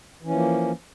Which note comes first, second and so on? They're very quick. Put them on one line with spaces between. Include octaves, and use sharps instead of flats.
E3 C#4 F3 A#3